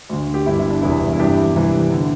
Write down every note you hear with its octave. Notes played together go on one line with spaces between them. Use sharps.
D2 D3
G4
G1 G2 D3 E4
E4
D4
E1 E2 C3 E4
E4
G1 G2 E3 D4 G4
C2 C3 E3
D3